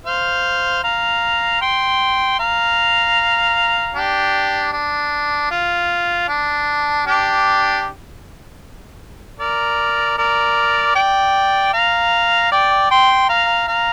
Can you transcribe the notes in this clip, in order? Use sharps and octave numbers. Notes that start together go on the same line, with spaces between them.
C5 F5
F5 A#5
G5 C6
F5 A#5
D4 G4
D4
F4
D4
D4 G4
A#4 D5
A#4 D5
D5 G5
F5 A#5
D5 G5
G5 C6
F5 A#5
F5 A#5